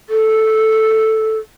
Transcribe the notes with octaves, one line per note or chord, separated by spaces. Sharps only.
A4